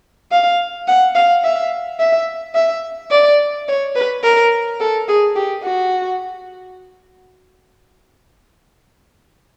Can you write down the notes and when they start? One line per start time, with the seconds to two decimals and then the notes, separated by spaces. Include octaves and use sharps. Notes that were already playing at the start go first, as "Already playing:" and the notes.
0.32 F5
0.88 F#5
1.15 F5
1.44 E5
2.00 E5
2.55 E5
3.11 D5
3.68 C#5
3.95 B4
4.23 A#4
4.80 A4
5.08 G#4
5.36 G4
5.64 F#4